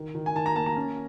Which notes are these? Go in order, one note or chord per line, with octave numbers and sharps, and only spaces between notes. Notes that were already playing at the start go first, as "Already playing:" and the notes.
Already playing: D#3
D#3
G#5
D#3 A5
A#5
A#3 A5
A#5
C#4